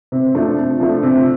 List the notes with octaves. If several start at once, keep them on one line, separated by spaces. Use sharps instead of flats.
C3
F3 A3 D4
C3
F3 A3 D4
C3